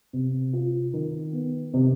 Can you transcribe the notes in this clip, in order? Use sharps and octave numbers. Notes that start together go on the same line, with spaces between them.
C3
F4
D#3
B3
C3